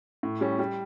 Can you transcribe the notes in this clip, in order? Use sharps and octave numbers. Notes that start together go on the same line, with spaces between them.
A2
G3 C#4
G3